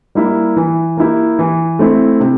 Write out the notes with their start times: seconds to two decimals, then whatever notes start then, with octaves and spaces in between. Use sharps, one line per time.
0.15 G3 A#3 E4
0.56 E3
0.97 A#3 E4 G4
1.39 E3
1.79 A3 C4 E4
2.20 C3